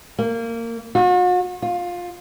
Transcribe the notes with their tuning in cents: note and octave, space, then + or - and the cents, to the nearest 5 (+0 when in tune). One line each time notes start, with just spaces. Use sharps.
A#3 -20
F#4 -45
F4 +15